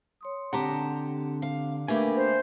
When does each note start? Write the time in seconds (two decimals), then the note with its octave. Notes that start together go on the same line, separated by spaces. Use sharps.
0.21 C#5 C6 D#6
0.53 D3 C4 G4 F#5 A5 A#5
1.42 F5
1.88 A3 A#3 D4 G4 A#4 B4 G#5 B5
2.16 C5